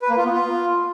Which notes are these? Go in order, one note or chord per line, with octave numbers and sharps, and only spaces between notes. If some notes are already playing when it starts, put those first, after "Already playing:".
B4
A#3
F4
B3
F4